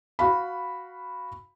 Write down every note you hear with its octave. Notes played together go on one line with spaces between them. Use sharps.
F#4 F5 B5